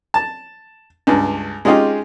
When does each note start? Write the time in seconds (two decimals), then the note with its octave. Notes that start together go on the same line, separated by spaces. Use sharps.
0.14 A5
1.07 C#2 G2
1.65 G#3 C#4 D#4 F4 G4 G#4